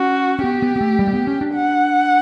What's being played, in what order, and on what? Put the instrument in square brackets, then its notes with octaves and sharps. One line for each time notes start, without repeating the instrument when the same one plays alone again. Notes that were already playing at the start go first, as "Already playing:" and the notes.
Already playing: [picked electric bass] C#4 [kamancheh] F#4
[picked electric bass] C#4
[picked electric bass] B3 [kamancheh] G4
[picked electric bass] B3
B3
A3
G3
A3
B3
C#4
D4
[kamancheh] F#5